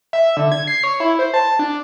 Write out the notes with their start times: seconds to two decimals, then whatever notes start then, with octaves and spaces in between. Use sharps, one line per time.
0.13 E5
0.37 D3
0.52 G#6
0.67 C7
0.84 C#5
1.00 E4
1.19 C5
1.34 A5
1.59 D4